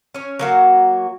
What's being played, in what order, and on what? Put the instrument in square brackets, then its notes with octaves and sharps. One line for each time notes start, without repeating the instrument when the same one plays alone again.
[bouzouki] C#4 C#5
F#3 A#3 F#4